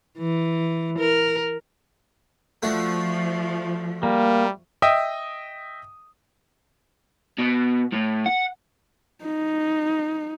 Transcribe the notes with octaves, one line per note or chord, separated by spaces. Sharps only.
E3
A#4
F3 A3 D4 F#4
G3 A#3
D#5 E5 G5 D#6
B2
A2
F#5
D#4